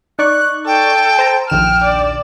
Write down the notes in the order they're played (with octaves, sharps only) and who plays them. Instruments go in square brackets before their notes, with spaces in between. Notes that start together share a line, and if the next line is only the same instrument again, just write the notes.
[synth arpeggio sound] D#4 D5 C#6 [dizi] F#6
[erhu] A4 [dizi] G5
[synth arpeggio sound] C5 A5 A#5
[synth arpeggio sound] A#1 D#2 E7 [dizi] G5 [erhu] F6
[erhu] D5